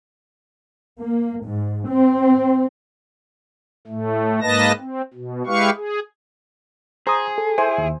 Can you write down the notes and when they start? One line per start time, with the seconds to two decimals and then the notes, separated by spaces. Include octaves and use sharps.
0.99 A#3
1.45 G#2
1.89 C4
3.87 A2 A3
4.42 G#2 A#3 B4 D#5 A5 A#6
4.79 C4
5.14 B2
5.47 G#3 E4 G4 B4 F5 C#6
5.75 G#4
7.07 G#4 C5 A#5 D#6
7.38 A4
7.58 E4 C5 G#5
7.78 D#2